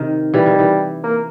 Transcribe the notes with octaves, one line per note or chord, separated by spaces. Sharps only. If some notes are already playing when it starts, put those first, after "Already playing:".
Already playing: C3 D#3
E3 G3
D#3
E3
A#3